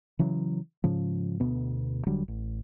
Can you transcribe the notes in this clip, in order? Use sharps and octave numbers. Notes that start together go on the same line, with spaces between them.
C#3 E3 F#3
G#2 C#3 F3
D2 B2 B3
E1 D3 F#3 G3
A1